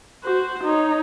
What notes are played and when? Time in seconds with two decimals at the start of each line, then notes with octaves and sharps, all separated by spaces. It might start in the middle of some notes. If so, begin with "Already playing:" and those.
0.24 F#4 C5
0.64 D#4 C#5